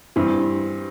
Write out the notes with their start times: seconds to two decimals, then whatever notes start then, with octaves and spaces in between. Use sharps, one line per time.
0.16 G2 E3 C4